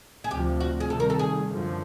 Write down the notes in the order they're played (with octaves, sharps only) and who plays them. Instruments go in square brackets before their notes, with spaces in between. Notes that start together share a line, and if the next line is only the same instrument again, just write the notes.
[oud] G#4
[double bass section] D2 C3 F3 [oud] G4
[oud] F#4
G#4
[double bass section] C3 D#3 G3 [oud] A4
[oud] A#4
A4
G#4
[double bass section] F#2 D3 F3